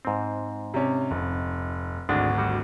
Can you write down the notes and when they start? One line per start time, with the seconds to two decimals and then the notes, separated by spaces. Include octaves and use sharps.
0.05 G#2 C4
0.74 C3 C#4
1.11 F1
2.09 G#1 D2 G#3 D4
2.38 G3 F#4